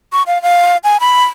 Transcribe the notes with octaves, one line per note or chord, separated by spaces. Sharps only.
C#6
F5
F5
G#5
B5